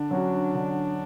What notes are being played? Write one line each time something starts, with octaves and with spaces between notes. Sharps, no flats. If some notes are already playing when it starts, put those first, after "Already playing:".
Already playing: D3 D4
F#3 C#4 F#4
D3